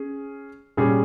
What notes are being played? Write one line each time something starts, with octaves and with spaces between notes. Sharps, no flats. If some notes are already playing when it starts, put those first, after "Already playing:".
Already playing: C#4 G#4
A#2 G3 C#4 G#4